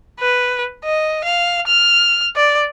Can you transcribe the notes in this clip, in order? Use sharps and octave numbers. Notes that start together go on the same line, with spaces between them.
B4
D#5
F5
F6
D5